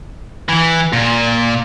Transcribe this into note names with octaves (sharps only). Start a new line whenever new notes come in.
E3
A#2